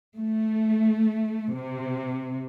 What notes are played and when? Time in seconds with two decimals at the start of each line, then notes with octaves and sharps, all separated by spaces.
0.18 A3
1.55 C3